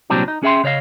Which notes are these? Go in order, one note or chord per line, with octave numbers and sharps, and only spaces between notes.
C2 A#2 F#3 C4 D4 G4
D#4
C#4 G#4 E5 G5 C6
C#3 C#5 D#5 F5